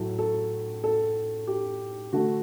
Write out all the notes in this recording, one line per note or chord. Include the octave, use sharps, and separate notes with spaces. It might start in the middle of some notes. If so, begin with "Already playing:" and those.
Already playing: A2 F#3 A3
A4
A4
G4
D3 A3 F#4